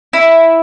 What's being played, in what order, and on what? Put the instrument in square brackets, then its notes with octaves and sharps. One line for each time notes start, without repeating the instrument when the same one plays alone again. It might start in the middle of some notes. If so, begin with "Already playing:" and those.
[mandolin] E4